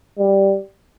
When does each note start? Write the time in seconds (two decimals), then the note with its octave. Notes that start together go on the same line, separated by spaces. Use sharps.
0.19 G3